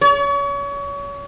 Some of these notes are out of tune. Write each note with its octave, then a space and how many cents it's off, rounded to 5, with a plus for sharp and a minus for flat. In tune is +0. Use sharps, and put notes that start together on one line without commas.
C#5 +35